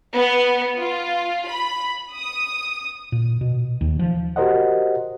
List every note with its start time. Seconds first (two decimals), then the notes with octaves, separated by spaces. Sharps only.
0.15 B3
0.78 F4
1.49 B5
2.12 D#6
3.12 A#2
3.41 B2
3.81 D#2
3.99 F3
4.36 F#4 G4 A#4 C5 D#5 F#5